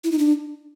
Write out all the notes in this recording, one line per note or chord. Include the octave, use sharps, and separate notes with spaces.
E4
D#4
D4